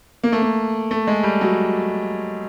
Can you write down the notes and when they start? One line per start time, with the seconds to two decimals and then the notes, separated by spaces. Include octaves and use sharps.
0.24 A#3
0.32 A3
0.42 A#3
0.91 A3
1.07 G#3
1.23 G3
1.41 F#3